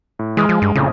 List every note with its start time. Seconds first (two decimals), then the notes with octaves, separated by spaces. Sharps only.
0.19 A2
0.37 E3 G#3 D#6 F6
0.49 F3
0.62 G2
0.75 A#1 F2 A2 C#3